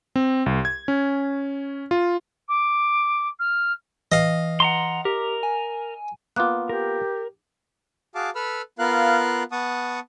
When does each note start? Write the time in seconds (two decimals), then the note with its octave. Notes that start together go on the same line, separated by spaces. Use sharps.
0.16 C4
0.46 C2
0.65 G#6
0.88 C#4
1.91 F4
2.48 D6
3.39 F6
4.12 E3 D#5 F5
4.60 F#5 A#5 C6
5.05 G4 A#4
5.43 G#5
6.36 A#3 B3 F4 D6 F#6
6.69 G4 A#4
8.15 F#4 G#4 F5 A5 D6
8.35 A4 B4 B5 E6 F6
8.79 B3 F4 A#4 F5 F#6
9.52 B3 F#5 A5 C#6 D#6